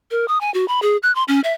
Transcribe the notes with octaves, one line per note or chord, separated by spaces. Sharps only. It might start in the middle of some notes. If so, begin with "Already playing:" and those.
A#4
D#6
G#5
F#4
B5
G#4
F#6
C6
C#4
E5